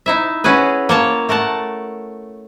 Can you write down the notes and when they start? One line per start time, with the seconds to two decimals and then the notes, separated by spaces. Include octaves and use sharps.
0.06 D#4 E4 E5
0.44 C#4 E4 F#4 G#4 B4
0.89 A#3 C#5 A5
1.29 A3 A#4 F#5 A5